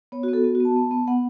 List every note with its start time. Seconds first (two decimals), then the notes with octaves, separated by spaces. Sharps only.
0.12 B3 C#5
0.23 F#4
0.28 B3 A4
0.44 B3 F#4
0.55 F#4
0.60 B3 A5
0.76 B3
0.91 B3
1.08 B3 F#5